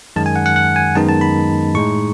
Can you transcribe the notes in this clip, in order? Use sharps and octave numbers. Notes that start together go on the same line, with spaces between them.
F#2 D#3 G#3 A5
G#5
F#5
F#5
F#5
G#5
F#2 D#3 G#3 B3 D#4 A5
A5
B5
A2 G#3 D#4 C#6